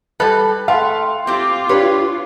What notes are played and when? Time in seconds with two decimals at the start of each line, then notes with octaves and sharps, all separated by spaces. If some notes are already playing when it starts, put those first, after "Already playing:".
0.20 G3 A4 B4 B5 F#6
0.68 A3 F5 G5 C6
1.27 C4 F4 G4 D6
1.69 D4 G4 B4 C#5